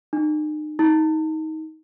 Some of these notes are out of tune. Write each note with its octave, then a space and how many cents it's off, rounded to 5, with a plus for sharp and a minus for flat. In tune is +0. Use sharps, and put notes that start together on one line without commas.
D#4 -40
D#4 +20